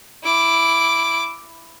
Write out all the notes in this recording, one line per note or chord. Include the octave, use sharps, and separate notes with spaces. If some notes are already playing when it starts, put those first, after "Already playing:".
E4 D6